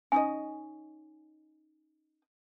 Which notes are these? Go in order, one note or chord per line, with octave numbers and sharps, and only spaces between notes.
C#4 D#4 D#5 G#5